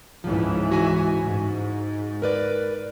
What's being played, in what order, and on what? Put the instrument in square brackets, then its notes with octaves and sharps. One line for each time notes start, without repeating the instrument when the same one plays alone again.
[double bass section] C#2 G#2 E3 [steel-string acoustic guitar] F3
[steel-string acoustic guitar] F#4 E5 G#5
[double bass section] G#2
[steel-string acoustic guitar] A#4 B4 D5